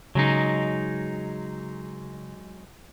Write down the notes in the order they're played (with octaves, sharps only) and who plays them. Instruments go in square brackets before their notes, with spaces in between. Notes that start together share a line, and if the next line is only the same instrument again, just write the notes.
[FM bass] C#3 [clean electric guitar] F#3 G#3 D#4